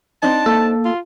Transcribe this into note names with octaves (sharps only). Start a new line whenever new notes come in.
C4 D4 D#4 A5
A#3 A4
F4